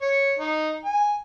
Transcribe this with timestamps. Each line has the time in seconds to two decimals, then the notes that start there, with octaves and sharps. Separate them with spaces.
0.02 C#5
0.39 D#4
0.85 G#5